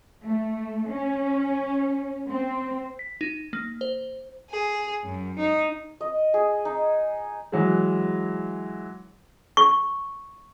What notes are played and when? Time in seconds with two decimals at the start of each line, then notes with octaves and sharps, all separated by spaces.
0.23 A3
0.90 C#4
2.28 C4
2.99 B6
3.21 D#4
3.53 A#3
3.81 C5
4.50 G#4
5.04 F#2
5.39 D#4
6.01 D#5
6.34 G#4
6.65 D#4
7.52 E3 F#3 G#3
9.57 C#6